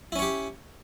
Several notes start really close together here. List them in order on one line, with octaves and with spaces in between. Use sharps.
E4 C#4 C#5 G4